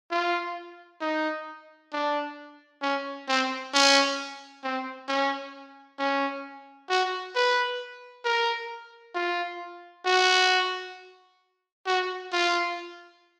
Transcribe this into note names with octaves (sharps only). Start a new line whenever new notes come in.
F4
D#4
D4
C#4
C4
C#4
C4
C#4
C#4
F#4
B4
A#4
F4
F#4
F#4
F4